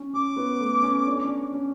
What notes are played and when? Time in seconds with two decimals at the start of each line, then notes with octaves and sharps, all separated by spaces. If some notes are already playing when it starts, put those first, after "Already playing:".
Already playing: C#4
0.14 C#4 D6
0.36 B3
0.60 A3
0.83 C#4
1.07 D4
1.16 C#4
1.25 D4
1.53 C#4